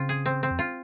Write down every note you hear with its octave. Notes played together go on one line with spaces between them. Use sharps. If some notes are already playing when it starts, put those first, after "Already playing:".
Already playing: C#3 C4 F4
G#4
C4
C4
F2
F4